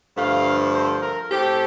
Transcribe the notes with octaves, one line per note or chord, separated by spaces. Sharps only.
G2 D3 F3 A3 F5
C5
A#4
A2 A3 C4 G4